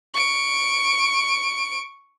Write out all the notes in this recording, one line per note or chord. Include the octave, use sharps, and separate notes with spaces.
C#6 D7